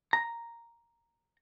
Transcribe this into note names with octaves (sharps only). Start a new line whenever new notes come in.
A#5